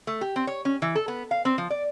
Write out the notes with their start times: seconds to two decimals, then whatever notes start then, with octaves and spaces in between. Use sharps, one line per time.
0.07 A3
0.21 G4
0.36 C4
0.47 C#5
0.65 C#4
0.82 E3
0.95 A4
1.08 B3
1.31 F5
1.45 C4
1.58 F3
1.70 D5